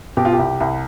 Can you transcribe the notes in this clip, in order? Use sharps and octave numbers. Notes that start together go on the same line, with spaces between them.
B2 G4
F4
G4
C2
C2